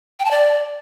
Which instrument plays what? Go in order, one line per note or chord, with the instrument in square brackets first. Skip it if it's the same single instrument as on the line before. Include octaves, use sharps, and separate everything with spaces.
[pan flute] G5
A5
D5